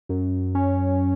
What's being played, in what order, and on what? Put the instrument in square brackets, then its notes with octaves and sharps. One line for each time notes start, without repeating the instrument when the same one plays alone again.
[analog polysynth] F#2
C#4